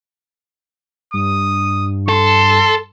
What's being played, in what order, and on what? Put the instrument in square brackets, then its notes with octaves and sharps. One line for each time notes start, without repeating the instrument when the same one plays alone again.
[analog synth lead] G2 [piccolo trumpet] D#6
[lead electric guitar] A4 [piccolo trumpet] C6